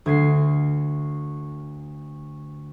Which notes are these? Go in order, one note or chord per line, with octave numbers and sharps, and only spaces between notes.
D2 G#6 C7